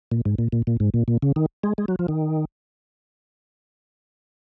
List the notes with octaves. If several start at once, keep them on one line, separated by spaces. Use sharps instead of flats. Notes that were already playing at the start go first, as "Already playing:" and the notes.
A#2
G#2
A#2
A#2
A#2
G#2
A#2
A#2
C#3
D#3
G#3
G#3
F#3
F3
D#3